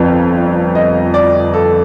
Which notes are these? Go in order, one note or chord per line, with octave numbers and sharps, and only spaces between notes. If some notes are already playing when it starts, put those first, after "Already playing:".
Already playing: G1 F2 F3
D#5
D5
A4